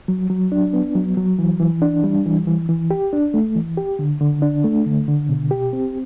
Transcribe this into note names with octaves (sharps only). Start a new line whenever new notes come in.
F#3
F#3
D4
B3
F#3
F#3
E3
E3
D4
G3
E3
E3
E3
G4
D4
A3
E3
G4
D3
D3
D4
A3
D3
D3
B2
G4
C4